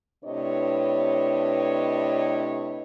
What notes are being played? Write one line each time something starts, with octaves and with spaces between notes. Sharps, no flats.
A2 C3 D4 B4 C#5 D#5